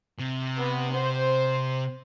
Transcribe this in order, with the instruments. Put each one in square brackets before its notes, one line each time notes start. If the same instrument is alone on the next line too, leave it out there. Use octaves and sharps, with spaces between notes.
[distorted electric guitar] C3
[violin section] B3
C5